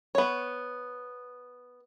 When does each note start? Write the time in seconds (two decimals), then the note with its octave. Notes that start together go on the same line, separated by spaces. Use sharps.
0.15 B3 C#5